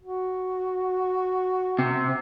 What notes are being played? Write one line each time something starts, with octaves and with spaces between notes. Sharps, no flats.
F#4
C3